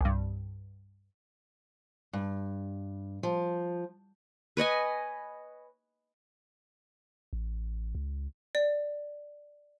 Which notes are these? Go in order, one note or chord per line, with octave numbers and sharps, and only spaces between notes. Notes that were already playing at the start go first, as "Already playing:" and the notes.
C2 G2
G2
F3
B4 C#5 D#5 G#5
A1
C#2
D5